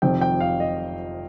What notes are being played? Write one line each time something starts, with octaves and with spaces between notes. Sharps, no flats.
F1 F2 C3 D#3 G5
G5
F5
D#5